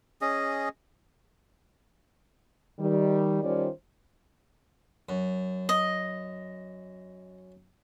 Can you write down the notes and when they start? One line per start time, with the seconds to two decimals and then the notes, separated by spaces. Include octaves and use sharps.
0.21 C#4 G#4 D#5
2.80 D#3 G3
3.43 D#3 G3 C#4 F4 C5 D5
5.09 F#2
5.69 D#5